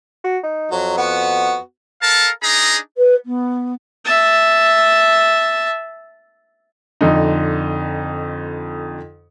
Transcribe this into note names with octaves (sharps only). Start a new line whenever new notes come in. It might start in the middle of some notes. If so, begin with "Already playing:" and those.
F#4
D#4
F2 F#3
B3 F#4
A4 A#4 F5 A5
D4 D#4 G#4 A#5
B4
B3
E5 A5
F2 D3 D#4